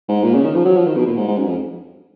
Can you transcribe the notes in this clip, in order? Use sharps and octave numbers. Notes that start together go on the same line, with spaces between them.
G#2
A#2
C#3
D#3
F3
F#3
F3
D#3
B2
A#2
G#2
G#2
F#2
F2